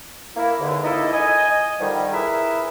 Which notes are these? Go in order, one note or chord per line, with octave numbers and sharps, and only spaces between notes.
A#3 E4
E2 G#2 D3
C#2 A#3 D#4 E4 A4 D#5
D#5 G#5
D3 D#3 F3 G3
E4 G#4 A#4 B4 E5